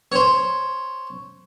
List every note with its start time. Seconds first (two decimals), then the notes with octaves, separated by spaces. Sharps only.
0.12 C5 C#5